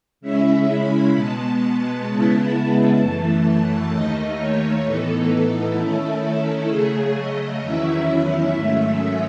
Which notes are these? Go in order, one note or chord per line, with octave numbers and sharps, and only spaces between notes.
C#3 G#3 C#4 E4 E5
B5
B2 G#3 B3 A5
C#3 G#3 B3 E4
F#2 E3 A3
D#2 D#3 A3 D#4 D#5
C#5
A2 E3 B3 D#4 A4
D#3 A3 C#4 E4
C#3 F#3 A3 G#4
D#5
E2 D#3 F#3 C#4 E4 E5
G#2 D#3 F#3 A3 C#4